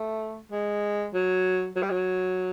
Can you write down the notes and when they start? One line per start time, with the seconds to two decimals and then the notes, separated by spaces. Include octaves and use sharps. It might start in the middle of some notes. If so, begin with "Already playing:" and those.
Already playing: A3
0.52 G#3
1.14 F#3
1.76 F#3
1.83 G3
1.91 F#3